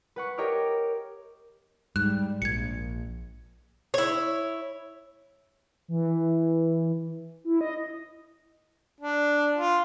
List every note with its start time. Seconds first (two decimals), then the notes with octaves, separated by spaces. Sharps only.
0.16 B4 F#5 C#6
0.38 G4 A#4 C#5 D#5 D6 F6
1.96 G#2 G3 F#6
2.42 A#1 G#6 C#7
3.94 E4 C#5
5.88 E3
7.44 E4
7.61 D#5
9.01 D4
9.56 F4